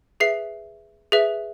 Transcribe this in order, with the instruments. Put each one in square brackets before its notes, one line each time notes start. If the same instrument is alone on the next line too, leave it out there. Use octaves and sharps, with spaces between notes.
[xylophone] G#4 B4 E5 C7
G#4 B4 E5